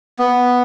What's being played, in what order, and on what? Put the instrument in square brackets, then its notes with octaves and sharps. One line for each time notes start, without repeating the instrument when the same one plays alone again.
[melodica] B3